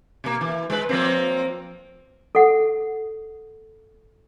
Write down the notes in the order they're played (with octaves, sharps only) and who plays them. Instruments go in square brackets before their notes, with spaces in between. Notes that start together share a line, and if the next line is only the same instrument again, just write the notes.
[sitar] B2 A#3
E3
G#3 B4
F3 A#3 C4
[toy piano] A4 F#5